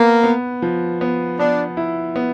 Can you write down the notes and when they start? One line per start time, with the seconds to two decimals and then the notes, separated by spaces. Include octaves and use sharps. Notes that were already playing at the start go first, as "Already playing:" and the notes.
Already playing: A#3 B3
0.23 B3
0.62 F3
1.01 B3
1.39 B3 D4
1.77 E4
2.16 B3